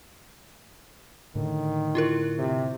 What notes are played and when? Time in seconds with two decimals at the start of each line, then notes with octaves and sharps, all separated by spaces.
1.35 A2 D3 D#3
1.95 E4 F4 A#4
2.38 C3